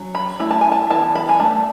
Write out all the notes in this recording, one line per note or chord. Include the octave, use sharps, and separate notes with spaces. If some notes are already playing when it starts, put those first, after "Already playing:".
Already playing: F#3 C#4
B5
A3 C#4 E4 B5
A5
G#5
A5
E3 B3 E4 A5
B5
G#5
A3 D4 A5